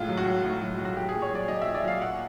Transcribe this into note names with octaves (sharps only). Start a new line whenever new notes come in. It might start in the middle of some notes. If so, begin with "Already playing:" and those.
Already playing: A2 G#3 F4
F#3
F#4
F#3
A2
F#3
F#3
F#4
F#3 G4
A#2 G#4
C#5
F#3 D5
F#3 D#5
E5
A#2
D5
F#3 F5
A#2 F#5